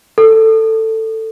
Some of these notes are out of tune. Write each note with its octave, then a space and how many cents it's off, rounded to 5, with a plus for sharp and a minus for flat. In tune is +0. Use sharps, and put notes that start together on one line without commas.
A4 +15